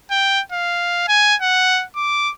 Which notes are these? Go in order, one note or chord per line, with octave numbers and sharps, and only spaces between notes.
G5
F5
G#5
F#5
D6